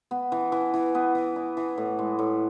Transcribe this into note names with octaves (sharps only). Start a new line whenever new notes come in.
B3
E3
E3
E3
B3
E3
E4
E3
A2
G#3
A2